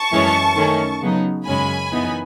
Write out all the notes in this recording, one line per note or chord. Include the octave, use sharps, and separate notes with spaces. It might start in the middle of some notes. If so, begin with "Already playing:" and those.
Already playing: A5 C#6
F#2 E3 G#3 C#4
D#3 A3 C#4
C#3 F#3 B3 D#4
F#2 C#3 G#3 C#4 G#5 B5
F#2 E3 B3 D#4